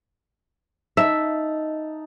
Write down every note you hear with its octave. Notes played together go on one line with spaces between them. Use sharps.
D#4 E5 A5